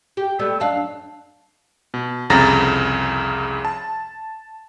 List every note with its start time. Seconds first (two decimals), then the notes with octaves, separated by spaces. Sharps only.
0.17 G4
0.39 G3 A3 B3 E6
0.60 F#2 D4 F5 A5
1.94 B2
2.30 C2 F2 C#3 A#5 A6 A#6
3.65 A5